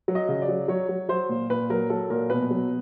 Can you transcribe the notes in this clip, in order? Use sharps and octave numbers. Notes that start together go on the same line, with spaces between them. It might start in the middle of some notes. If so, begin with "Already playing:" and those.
F#3
D#5
C#3
D5
F#3
F#3 C#5
F#3
F#3 C5
A#2
A#2 B4
F#3 A#4
F#3 A4
A#2 A#4
B2 B4
F#3